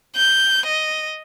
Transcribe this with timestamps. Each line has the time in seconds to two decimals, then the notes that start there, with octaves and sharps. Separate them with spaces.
0.16 G6
0.66 D#5